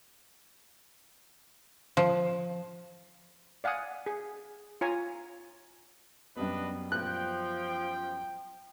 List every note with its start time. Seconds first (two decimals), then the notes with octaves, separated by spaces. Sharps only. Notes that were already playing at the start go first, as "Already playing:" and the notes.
1.97 F3
3.64 D5 F5 F#5 G#5 D#6
4.06 G#4
4.81 F4 C#5 G#5 A#5
6.37 F#2 G3 B3 D4 B4 D#5
6.92 F3 G5 F#6